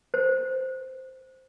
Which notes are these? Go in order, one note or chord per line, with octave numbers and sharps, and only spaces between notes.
C5